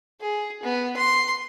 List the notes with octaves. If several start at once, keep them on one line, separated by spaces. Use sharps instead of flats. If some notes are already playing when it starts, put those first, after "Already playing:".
G#4
B3
C6